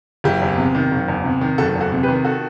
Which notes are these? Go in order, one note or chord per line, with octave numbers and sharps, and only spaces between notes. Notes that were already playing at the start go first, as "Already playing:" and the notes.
F#1 E4 G4
E2
C3
D#3
F#1
E2
C3
D#3
F#1 F#4 A4
E2
F#4 A4
C3
G4 B4
D#3
F#4 A4